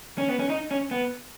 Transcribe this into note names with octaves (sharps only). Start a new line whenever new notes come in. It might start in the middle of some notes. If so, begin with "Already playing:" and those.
C#4
B3
C#4
D#4
C#4
B3